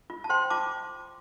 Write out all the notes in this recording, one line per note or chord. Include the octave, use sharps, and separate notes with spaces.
F4
A5
C5 G5 C6
F4 A5 D6